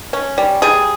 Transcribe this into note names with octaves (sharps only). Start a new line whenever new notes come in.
C#4
G3
G3 G#4